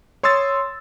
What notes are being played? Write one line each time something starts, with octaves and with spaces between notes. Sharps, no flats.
C#5 C6 D#6 E6 A6